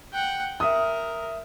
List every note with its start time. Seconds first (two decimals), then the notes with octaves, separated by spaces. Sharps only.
0.13 F#5 G5
0.60 A#4 E5 D#6